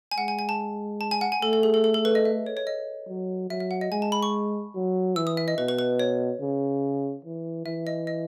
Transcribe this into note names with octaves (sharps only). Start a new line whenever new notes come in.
G#5
G#3 F#5
G#5
G#5
A5
A5
G#5
F#5
G#5
A3 A4
A4
G#4
A4
A4
A4
B4
D#5
E5
C#5
C#5
D#5
F#3
F#3 E5
E5
F#5
D#5
G#3 G#5
A5
B5
C#6
F#3
E3 E6
D#6
E5
D#5
B2 B4
B4
B4
C#5
C#3
E3
E3 E5
D#5
D#5